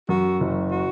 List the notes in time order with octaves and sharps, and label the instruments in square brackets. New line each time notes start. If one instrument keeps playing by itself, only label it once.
[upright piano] F#2 [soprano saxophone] F#4
[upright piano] F#1
[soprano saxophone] F#4